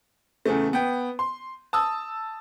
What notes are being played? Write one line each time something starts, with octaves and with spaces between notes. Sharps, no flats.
E2 C#3 A3
B3 G5
C6
A5 D#6 E6